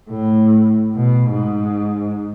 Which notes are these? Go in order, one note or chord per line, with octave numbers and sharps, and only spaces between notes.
A2
B2
G#2